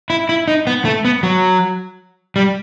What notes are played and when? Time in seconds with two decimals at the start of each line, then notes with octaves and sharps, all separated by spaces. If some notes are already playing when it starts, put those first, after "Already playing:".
0.10 E4
0.29 E4
0.48 D#4
0.67 B3
0.85 A3
1.05 B3
1.23 F#3
2.36 G3